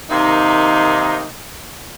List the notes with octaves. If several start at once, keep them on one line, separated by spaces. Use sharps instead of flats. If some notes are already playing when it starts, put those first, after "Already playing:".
C3 D#3 A#3 D#4